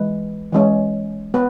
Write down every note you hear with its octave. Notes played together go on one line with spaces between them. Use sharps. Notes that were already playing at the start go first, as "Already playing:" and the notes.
Already playing: E3 G#3 B4
E3 G#3 C#4
B3 B4